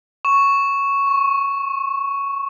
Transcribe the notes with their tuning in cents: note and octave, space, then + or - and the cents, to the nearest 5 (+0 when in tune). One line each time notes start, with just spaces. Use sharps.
C#6 +0
C#6 -45